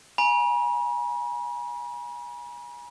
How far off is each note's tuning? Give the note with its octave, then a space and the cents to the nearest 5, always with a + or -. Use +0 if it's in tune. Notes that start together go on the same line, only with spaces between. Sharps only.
G#5 +0 B5 -45